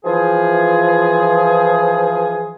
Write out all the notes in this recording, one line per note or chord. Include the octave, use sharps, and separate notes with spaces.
E3 F3 G#4